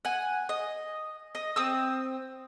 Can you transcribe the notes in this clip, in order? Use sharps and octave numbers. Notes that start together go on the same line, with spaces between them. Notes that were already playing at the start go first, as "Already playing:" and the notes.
F#5 G#5
D#5
D#5
C4 D#6 E6